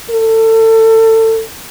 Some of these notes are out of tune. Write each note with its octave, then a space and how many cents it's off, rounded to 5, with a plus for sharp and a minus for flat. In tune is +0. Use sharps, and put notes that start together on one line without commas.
A4 +30